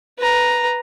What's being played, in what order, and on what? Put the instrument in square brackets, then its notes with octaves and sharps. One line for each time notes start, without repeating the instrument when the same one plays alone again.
[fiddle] B4 A#5